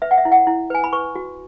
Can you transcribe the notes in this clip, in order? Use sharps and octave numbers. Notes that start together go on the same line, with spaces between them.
B4 E5
F#5
E5
E4
F#5
E4
B4 G#5
B5
B4 C#6
F#4